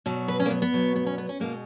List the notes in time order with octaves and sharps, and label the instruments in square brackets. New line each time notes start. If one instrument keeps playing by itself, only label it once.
[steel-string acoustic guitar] B2 F#3
B4
C#4
A#3
B3
B3
B2 F#3
B3
C#4
B3
C#4
B2 G#3 A#3